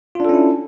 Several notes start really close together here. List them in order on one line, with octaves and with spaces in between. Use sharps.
F4 D4 A4 C#4 E4